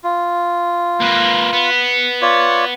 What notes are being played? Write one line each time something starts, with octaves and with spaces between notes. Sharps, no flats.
F4
A#3 B4
B3
F4 C#5 D5